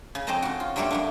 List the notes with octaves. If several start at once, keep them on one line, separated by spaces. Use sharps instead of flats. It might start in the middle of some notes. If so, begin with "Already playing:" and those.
C#3
F2 C4 C5 D#5 A5 A#5
C#3 F#4
F4
G2 F#3 G3 A3 A#3 A4
F#2 A3 D4